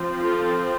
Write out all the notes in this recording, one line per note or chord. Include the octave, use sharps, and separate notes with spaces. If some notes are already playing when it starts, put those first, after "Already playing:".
Already playing: F3 C4
F4 A4